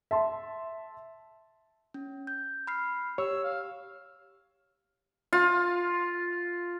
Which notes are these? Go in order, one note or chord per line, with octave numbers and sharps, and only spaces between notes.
E5 A5 C6
C#4
G6
B5 F6 C7
G4 C#5 E6
F5
F4